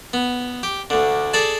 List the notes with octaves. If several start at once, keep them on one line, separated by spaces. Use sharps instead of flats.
B3
G4
D2 D3
G#4 A4 D5 A5